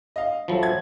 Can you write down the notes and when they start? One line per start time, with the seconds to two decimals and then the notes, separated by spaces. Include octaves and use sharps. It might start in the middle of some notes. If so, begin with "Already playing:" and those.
0.16 D#5 F5
0.48 F3 F#3 A4 E5 B5
0.63 G#6